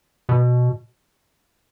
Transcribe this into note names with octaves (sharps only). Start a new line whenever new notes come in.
B2